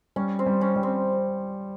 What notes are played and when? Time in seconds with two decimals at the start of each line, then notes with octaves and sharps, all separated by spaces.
0.16 G3 C#4
0.39 C4
0.46 G3
0.61 C#4
0.76 G3
0.83 C4